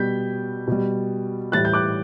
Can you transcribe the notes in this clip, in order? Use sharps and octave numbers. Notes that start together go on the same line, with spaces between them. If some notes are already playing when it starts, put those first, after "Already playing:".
Already playing: B2 G3 G6 B6
B2 G3
A2 E3 G3 F#6 A6
G6
D6 F#6